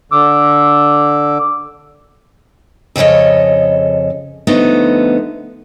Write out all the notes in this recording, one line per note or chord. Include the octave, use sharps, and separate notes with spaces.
D3 D6 E6
F2 C#3 A4 C#5 D#5
D3 F3 A3 B3 D#4